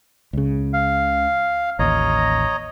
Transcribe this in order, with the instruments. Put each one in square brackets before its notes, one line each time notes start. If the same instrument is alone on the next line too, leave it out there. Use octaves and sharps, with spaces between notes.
[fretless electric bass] C#2 C#3
[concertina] F5
[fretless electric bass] A1 D#2 [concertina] C#5 D#5 A#5